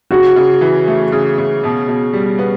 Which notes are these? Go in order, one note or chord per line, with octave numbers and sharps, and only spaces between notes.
C#3 F#4
C#3
E3
A3
C#3
C#3
B2
B2
G3
B3